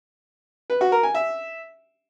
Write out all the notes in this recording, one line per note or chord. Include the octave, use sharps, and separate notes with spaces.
B4
F#4
A#4
G#5
E5